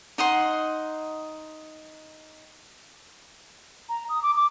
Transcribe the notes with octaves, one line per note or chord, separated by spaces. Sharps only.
D#4 D#5 F#5 C6
A#5
D#6
D6
D6